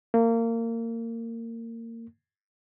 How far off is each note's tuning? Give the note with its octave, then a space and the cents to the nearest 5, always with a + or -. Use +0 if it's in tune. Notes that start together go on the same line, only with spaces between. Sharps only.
A#3 -25